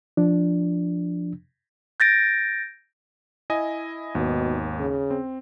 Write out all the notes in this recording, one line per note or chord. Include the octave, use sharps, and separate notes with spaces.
F3 D4
G6 A6 A#6 D7
E4 D#5 G#5
G#1 D#2 B2
C#3
C4